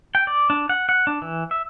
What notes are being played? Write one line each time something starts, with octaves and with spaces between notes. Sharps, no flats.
G5
D5
D4
F#5
F#5
D4
E3
E5